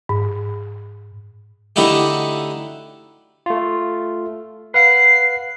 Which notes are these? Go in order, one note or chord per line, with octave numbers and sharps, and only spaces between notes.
G#2
D3 A3 D#4 E4 F#4 G4
A3 F4
B4 F5 F#5 C7